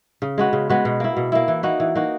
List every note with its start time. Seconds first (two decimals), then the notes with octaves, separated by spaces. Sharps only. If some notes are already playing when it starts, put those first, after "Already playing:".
0.22 C#3
0.38 G#3 B3 F#4
0.53 C#3
0.69 G#3 B3 F#4
0.85 B2
1.00 A#3 E4
1.17 B2
1.32 A#3 E4
1.48 E3
1.63 A#3 D#4 F#4
1.80 E3
1.95 A#3 D#4 F#4